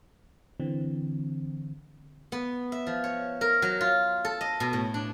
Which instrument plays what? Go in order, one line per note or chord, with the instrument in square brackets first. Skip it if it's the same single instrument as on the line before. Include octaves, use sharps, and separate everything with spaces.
[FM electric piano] D3 E3 C4
[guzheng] B3
E5
F3
C#5
A#4
F#3
F4
A4
D#5
B2
A2
D4